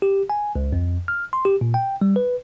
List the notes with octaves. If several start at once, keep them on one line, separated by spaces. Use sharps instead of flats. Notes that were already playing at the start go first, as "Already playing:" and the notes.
G4
G#5
C#2
F2
F6
C6
G4
A#2
G5
G3
B4